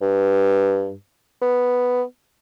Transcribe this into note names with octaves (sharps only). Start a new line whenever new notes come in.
G2
B3